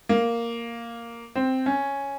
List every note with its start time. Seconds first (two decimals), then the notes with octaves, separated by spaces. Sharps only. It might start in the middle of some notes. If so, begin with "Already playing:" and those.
0.09 A#3
1.35 C4
1.66 C#4